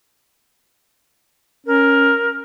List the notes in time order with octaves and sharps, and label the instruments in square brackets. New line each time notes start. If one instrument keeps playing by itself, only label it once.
[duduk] C#4 [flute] A#4